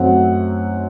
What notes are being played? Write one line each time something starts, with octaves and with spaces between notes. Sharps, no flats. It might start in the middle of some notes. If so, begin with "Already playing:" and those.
Already playing: F#2 F#3 A3 C4 D#4 F#5